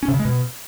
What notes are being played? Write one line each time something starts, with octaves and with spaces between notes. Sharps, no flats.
C#4
C3
C#3
G#3
B2